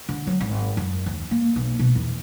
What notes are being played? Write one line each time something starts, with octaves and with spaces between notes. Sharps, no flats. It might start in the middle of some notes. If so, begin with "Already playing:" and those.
D3
F#3
G#1
F#2
D#2
A#3
B1
B2
E2